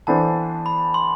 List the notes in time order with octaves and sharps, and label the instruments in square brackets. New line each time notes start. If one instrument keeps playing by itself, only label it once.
[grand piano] E3 B3 D4 A4 C5 [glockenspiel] A5
[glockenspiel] B5
C6